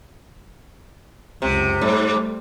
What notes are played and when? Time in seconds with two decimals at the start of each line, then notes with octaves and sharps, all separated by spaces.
1.42 C#2 F#2 C3
1.81 G#2 G3 A3